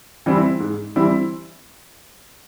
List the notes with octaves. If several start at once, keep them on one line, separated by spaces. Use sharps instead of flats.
E3 G3 C4 E4
G#2
E3 G3 C4 E4